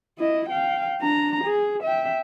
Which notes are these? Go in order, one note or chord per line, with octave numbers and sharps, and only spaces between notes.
E4 D#5
F5 G5
D4 A#5
G#4
E5 G5